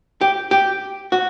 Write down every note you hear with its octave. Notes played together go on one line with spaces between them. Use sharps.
G4
G4
F#4